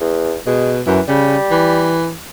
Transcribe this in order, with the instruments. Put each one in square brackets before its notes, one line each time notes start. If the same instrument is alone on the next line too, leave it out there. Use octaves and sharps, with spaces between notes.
[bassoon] E2
[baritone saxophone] B2 [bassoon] G#3
[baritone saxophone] F#2 [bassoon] E3
[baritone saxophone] C#3 [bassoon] G3
[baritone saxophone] E3